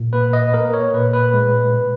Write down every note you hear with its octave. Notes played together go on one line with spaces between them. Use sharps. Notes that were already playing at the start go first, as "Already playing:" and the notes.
Already playing: A#2
A#3 B4
D#5
A#3 A#4
C#5
A#2 B4
B4
G#3
B2